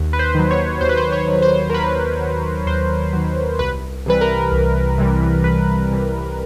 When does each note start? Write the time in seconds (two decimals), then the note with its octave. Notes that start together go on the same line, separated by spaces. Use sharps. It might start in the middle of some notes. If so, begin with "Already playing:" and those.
Already playing: D#2
0.13 B4
0.19 C5
0.35 D#3 F#3
0.51 C#5
0.81 D#2 C5
0.89 B4
0.97 C5
1.12 C#5
1.27 D#3 F#3
1.42 C5
1.70 A#4
1.73 D#2 B4
2.20 D#3 F#3
2.66 D#2 C5
3.13 D#3 F#3
3.59 C2 B4
4.06 C3 E3 G3 B4
4.21 A#4
4.52 C2
4.98 C3 E3 G3
5.44 C2 B4
5.91 C3 E3 G3